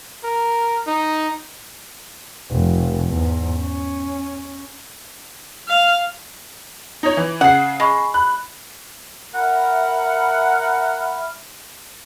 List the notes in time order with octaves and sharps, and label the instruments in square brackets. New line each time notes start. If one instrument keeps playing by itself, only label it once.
[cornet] A#4
D#4
[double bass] F1 F2
E2 G#2
C#4
[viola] F5
[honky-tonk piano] D#4 C#5
E3
[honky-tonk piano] C#3 C7 [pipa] F#5
[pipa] G#3 [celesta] G#5 B5 C#6
[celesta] B5 [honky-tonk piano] F#6
[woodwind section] A#4 F#5 [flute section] E5 B5 F6